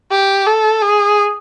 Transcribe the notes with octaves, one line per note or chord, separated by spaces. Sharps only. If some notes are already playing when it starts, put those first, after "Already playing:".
G4
A4
G#4